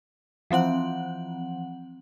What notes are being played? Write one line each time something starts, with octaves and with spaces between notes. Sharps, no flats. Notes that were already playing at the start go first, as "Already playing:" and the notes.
E3 F3 C4 F#5 F#7